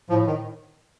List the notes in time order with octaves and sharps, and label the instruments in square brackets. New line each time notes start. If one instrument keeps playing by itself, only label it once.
[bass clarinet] A2 [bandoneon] F3
[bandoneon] D#3